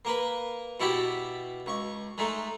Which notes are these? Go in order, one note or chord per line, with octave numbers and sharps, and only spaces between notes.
A#3 A#4 B4
B2 E4 F#4 G4 A5 B5
C#2 C#6
G#3 A3 D#4